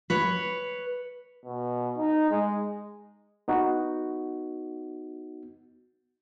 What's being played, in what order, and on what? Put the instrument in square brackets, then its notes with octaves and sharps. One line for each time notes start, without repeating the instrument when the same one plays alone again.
[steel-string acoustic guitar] B4 C#5
[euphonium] B2
D#4
G#3
[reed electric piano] B3 D#4 F#4